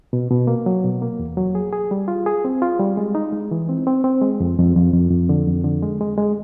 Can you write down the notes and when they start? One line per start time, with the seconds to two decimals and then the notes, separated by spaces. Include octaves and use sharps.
0.13 B2
0.31 B2
0.47 A#3
0.66 F#3
0.84 B2
1.02 A#3
1.19 E2
1.37 F#3
1.55 G#4
1.73 G#4
1.91 G3
2.08 F4
2.26 G#4
2.45 C4
2.62 F4
2.80 G3
2.97 G#3
3.15 D#4
3.33 G#3
3.51 E3
3.69 C4
3.87 C4
4.04 C4
4.22 G#3
4.40 F2
4.58 F2
4.76 F2
4.93 F2
5.11 F2
5.29 D3
5.47 F2
5.64 D3
5.83 G#3
6.01 G#3
6.18 G#3